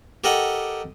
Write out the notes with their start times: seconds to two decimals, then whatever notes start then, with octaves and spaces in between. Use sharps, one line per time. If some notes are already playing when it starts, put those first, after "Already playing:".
0.24 G4 A4 A#4 D#5 F#5 G5